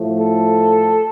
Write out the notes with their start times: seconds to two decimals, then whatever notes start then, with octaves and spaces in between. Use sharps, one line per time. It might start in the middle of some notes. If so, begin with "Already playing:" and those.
Already playing: A2 F3 A3
0.18 A4